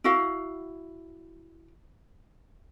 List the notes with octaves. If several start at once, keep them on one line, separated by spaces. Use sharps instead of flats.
E4 F#4 F5